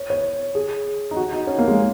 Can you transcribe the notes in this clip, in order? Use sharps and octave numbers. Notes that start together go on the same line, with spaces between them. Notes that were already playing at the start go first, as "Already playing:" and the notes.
Already playing: C#5
C#5
G#4
D#4
F#4
D#4
C#4
A#3
G#3